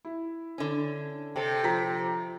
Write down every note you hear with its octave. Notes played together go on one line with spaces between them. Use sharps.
E4
D3 C#4
C3 A4 G5
F3 A#5 B6